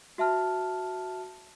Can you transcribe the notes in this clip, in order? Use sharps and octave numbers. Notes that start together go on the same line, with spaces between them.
F#4 E5 A5 F6